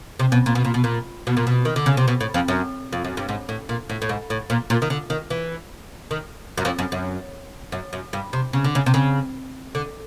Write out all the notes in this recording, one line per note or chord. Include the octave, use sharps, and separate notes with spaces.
C3
B2
A#2
B2
A#2
B2
A#2
B2
A#2
B2
D#3
D3
C#3
C3
B2
A2
F2
F#2
F2
F#2
G2
G#2
A2
A#2
A2
A2
G#2
A2
A#2
A#2
D#3
D3
D#3
E3
D#3
F#2
F2
F#2
F#2
F#2
F#2
G2
C3
C#3
D3
C#3
C3
C#3
D3